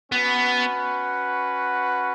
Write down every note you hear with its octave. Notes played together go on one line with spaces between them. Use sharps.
B3 C#4 F#4 B4 F#5